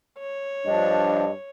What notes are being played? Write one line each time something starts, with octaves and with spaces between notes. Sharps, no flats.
C#5
G2 F3 D4 D#5